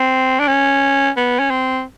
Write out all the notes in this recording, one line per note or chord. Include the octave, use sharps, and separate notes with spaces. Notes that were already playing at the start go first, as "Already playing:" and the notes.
Already playing: C4
D4
C#4
B3
C#4
C4